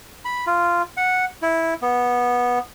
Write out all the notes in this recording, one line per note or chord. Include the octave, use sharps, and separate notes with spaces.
B5
F4
F#5
E4
B3